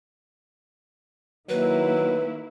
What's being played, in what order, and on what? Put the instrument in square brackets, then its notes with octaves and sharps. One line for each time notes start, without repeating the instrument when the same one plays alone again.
[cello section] D#3 A#3 E4 [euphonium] F#3 [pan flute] B4